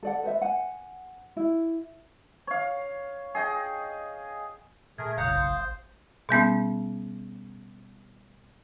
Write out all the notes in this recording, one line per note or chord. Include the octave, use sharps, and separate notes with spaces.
A4 D5 F#5
B4 C5 E5
F#5 G#5
E4
C#5 F5
G#4 D#5 G5
A#2 A3 G#4 A#4 G#6
F#1 B1 C#5 F5 F#5 A#5 D#6 G6
A1 C5
B2 G3 B3 C#4